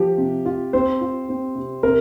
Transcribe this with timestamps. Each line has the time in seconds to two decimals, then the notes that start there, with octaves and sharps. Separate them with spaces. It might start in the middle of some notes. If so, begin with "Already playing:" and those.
Already playing: F3 G4
0.18 C3
0.46 F4
0.73 C4 C5
1.01 F4
1.29 C4
1.55 C3
1.83 C3 A#4